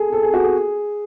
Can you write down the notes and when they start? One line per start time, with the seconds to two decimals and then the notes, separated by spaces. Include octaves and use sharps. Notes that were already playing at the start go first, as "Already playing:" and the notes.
Already playing: G#4 A4
0.12 A4
0.23 G#4
0.34 F#4
0.44 G#4